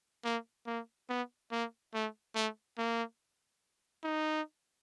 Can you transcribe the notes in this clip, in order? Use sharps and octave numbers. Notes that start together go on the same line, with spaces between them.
A#3
A#3
B3
A#3
A3
A3
A#3
D#4